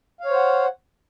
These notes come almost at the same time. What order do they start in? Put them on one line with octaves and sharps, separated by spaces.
F5 C#5 C5 F#5